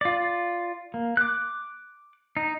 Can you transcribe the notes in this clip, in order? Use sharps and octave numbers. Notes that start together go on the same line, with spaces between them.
F4 D5
A#3
D6 F#6
D#4